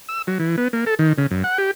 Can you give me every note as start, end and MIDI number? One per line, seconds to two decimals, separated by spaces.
0.09 0.22 88
0.27 0.38 54
0.40 0.56 52
0.57 0.68 59
0.73 0.85 58
0.86 0.95 69
0.99 1.13 51
1.18 1.27 49
1.31 1.43 42
1.44 1.58 78
1.58 1.71 67